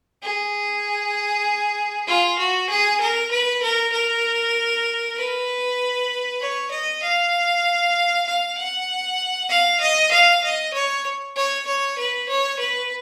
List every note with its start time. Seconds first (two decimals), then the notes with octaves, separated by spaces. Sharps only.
0.22 G#4
2.07 F4
2.38 F#4
2.69 G#4
3.00 A#4
3.31 B4
3.62 A#4
3.92 A#4
5.16 B4
6.41 C#5
6.71 D#5
7.02 F5
8.27 F5
8.57 F#5
9.49 F5
9.80 D#5
10.11 F5
10.43 D#5
10.73 C#5
11.36 C#5
11.67 C#5
11.98 B4
12.28 C#5
12.59 B4